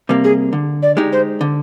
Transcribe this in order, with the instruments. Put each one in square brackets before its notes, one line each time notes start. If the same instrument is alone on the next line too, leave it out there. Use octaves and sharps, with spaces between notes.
[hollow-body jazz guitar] C3 G3 A#3
[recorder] G#4
[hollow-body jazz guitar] D3
[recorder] D5
[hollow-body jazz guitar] G#3 D#4 G4
[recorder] C5
[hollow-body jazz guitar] D3